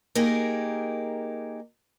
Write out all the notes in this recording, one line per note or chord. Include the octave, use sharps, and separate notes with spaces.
A#3 D#4 G4 G#4 A#4